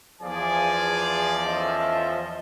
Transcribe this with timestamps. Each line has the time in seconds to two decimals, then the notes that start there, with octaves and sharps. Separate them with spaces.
0.22 E2 F3 G#4 D5 G#5
1.46 C#4 A4 D#5 E5